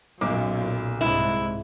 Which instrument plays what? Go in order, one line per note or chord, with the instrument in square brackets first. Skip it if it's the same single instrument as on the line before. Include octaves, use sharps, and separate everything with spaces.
[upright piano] B1 D6 [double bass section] F#2 A#2
[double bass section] C2 G#2 [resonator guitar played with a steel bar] E4